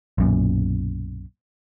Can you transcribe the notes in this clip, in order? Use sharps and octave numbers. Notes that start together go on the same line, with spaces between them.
B1 F#2 A#2